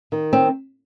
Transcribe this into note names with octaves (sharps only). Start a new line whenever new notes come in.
D#3
C4